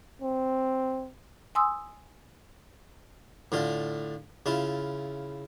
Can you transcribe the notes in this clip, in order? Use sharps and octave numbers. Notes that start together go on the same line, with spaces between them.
C4
G#5 C6 D#6 E6
A2 D3 F4
C#3 E4 F4